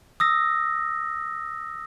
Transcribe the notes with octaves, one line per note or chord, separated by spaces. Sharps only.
D#6 E6 A#6